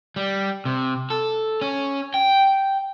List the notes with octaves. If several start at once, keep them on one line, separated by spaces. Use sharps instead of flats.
G3
C3
A4
C#4
G5